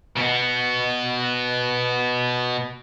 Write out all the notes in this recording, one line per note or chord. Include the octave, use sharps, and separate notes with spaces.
B2 B3